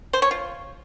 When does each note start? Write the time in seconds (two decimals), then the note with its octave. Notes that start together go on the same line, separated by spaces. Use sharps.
0.13 C5
0.22 C#5
0.31 F4